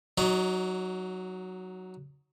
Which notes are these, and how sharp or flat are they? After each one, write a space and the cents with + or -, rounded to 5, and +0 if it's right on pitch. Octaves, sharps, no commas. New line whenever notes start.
F#3 +0 D#4 +10 C#5 +45